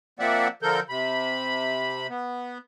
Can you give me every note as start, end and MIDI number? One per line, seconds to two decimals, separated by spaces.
0.19 0.48 53
0.19 0.48 58
0.19 0.48 60
0.19 0.48 74
0.19 0.48 76
0.19 0.48 78
0.62 0.80 50
0.62 0.80 53
0.62 0.80 69
0.62 0.80 70
0.62 0.80 91
0.89 2.07 48
0.89 2.07 83
2.10 2.58 59